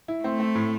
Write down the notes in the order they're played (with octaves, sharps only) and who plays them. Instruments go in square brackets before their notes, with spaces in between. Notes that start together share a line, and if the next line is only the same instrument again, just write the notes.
[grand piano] E4
[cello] A3 [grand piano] C4
[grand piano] C4
A2